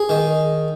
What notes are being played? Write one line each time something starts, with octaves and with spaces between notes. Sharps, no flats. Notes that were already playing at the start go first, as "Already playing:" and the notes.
Already playing: G#4
D#3